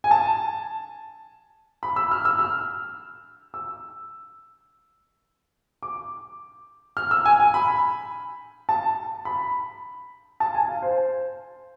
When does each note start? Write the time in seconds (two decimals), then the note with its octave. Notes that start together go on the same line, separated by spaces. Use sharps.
0.04 G#5
0.11 A5
1.83 B5
1.96 E6
2.11 F6
2.25 E6
2.39 F6
3.54 E6
5.83 D6
6.97 F6
7.11 E6
7.25 G#5
7.40 G#5
7.54 B5
8.69 A5
9.25 B5
10.40 A5
10.55 G#5
10.68 F5
10.82 C5